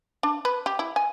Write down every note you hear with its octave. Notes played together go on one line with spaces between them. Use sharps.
D4
B4
G4
E4
G#5